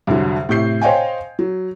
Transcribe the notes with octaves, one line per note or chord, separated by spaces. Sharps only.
C2 F2 D3 F#3
A2 C3 G6 C7
C5 C#5 D#5 F5 G5 G#5
F#3